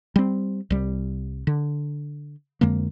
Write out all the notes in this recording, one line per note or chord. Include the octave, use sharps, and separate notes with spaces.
G3 C4
C2 G3
D3
F2 D3 G#3 A#3